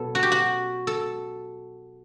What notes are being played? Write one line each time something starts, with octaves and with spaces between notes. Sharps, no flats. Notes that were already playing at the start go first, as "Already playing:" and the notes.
Already playing: B2 F#3 A4 B4
F#4
G4
F#4
A4